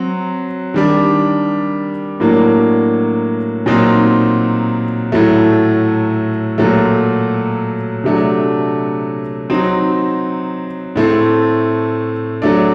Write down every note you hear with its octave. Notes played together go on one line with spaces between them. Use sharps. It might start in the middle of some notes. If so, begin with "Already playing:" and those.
Already playing: F#3 C4
D#3 G3 D4
A2 F#3 A#3 D4
A#2 F#3 C4 D#4
A2 F#3 A3
A#2 F#3 A3
C3 F#3 A3 D4
F#3 C4 D#4
A2 A3 C4
F#3 A3 D4